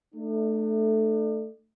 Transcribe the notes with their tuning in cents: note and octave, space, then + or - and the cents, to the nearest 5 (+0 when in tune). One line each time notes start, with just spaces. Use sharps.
A3 +0 D4 +40